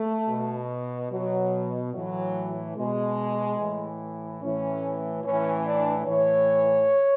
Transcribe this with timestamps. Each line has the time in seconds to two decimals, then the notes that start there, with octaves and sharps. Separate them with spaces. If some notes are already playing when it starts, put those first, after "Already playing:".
Already playing: A3
0.28 B2
1.11 B2 F#3
1.93 A2 E3 F#3
2.76 B2 G#3
3.58 A2 E3
4.41 A2 E3 C#4
5.23 A2 E3 C#4
5.65 D4
6.06 A2 E3 C#5